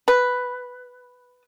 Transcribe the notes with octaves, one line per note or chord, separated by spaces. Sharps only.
B4